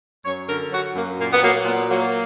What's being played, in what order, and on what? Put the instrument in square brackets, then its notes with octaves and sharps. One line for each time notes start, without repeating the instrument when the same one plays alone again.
[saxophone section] F#2 C#5
D3 A#4
F#3 F#4
F#2 A#3
A#2 A#3
B3
F#3 A#3
A#2 B3
F#3 A#3